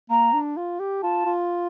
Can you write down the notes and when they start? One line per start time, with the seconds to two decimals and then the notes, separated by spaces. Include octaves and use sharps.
0.10 A#3 A#5
0.33 D4
0.57 F4
0.80 G4
1.02 F4 A5
1.26 F4